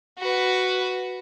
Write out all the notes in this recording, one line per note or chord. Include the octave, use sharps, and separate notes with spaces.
F#4 B4